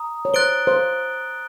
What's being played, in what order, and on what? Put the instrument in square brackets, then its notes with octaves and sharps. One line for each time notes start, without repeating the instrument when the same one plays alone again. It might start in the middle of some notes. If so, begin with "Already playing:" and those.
Already playing: [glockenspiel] A#5 D#6
[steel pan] C#5
[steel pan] C5 [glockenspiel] F#6 A6 D7 G7
[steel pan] C5